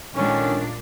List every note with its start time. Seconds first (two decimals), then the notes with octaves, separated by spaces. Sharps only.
0.15 A#2 D3 D#3 G#3 C#4 D4